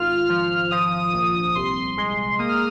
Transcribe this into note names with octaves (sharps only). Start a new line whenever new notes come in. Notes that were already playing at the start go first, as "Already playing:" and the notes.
Already playing: G#1 F4 F6
F3
F3 D#6
A#1
C2 C6
G#3
A#3 D#6
F6